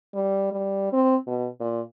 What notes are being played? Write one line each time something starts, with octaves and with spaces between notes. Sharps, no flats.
G3
G3
C4
B2
A#2